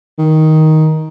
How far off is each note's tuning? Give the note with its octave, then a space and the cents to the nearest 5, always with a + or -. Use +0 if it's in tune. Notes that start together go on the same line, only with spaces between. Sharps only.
D#3 +10